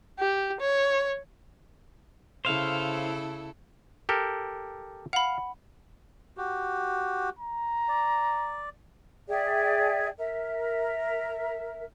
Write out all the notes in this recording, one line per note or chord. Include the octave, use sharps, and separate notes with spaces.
G4
C#5
C#3 E4 A4 C5 F5
G4 A4 A#4
F5 F#5 B5
F#4 G4
A#5
D5
G#4 D5 E5 G5
A#4 E5